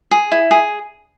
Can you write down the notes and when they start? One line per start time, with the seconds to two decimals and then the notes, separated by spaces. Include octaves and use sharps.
0.11 G#4
0.32 E4
0.51 G#4